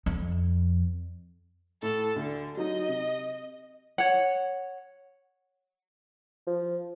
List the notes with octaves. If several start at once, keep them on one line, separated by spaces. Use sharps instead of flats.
F2
A2 A4
D2 D3
F#3 D#4 D#5
C3
C#5 F#5
F3